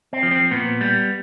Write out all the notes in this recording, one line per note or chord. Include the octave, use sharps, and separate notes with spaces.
C4
F3
C4
A#2 B3
G3